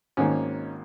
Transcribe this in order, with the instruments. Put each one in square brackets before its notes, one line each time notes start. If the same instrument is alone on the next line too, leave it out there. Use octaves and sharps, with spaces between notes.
[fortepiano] G#1 G#2 D#3 A#3 C#4